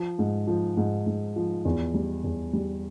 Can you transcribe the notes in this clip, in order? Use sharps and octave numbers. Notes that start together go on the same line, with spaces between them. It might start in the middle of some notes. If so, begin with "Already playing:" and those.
Already playing: F3
G#2
F3
G#2
G#2
F3
E2
G3
E2
G3